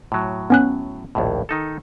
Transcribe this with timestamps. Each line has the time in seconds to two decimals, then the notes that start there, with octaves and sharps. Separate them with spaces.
0.12 A2 F#3
0.50 B3 C#4 F#6
1.15 A#1 D#2 A2
1.49 D#3 D#4 A4